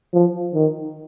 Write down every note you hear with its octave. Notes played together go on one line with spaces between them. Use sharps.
F3
D#3